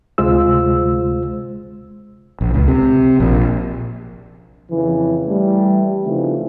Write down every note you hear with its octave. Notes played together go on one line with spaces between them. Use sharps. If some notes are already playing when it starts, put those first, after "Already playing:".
D2 C3 G#3 F4 C5 E6
A#1
C#2
C3
A#1
F2 C#3 E3
E3 G3 A3
C#3 E3 F3 A3 C4 D#4